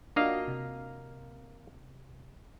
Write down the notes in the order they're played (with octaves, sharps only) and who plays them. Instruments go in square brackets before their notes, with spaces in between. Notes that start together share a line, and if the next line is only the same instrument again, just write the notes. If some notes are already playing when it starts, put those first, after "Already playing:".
[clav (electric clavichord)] A#3 D#5 F5 [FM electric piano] D4 F4 F#4
[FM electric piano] C3